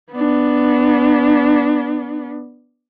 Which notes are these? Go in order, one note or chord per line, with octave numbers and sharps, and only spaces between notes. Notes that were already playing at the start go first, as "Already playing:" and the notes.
B3 D4